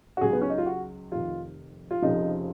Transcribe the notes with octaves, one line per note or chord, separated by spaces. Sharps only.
F#4
C#2 C#3 F#3 G#4
B3
C#4
D#4
F4
F#4
F1 F2 D#3 F4
F4
F1 F2 C#3 F3 D#4